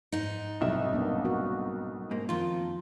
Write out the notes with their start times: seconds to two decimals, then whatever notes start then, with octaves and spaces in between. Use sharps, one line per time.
0.12 G#2 D#4
0.61 B1 G2 C3 E5
0.93 A#3 B3 D4
1.25 F#4 A#4
2.11 G#2 A#3
2.29 F2 D#3 F4